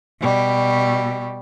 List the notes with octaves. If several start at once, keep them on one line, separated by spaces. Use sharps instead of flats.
B2 G3